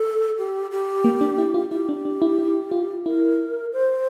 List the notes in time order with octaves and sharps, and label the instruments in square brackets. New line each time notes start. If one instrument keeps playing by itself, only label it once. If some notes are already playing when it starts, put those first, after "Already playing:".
Already playing: [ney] A4
G4
G4
[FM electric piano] A#3
D4
E4
F4
[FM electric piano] E4 [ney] G4
[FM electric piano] D4
D4
E4
E4
F4
[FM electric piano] E4 [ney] A#4
[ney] C5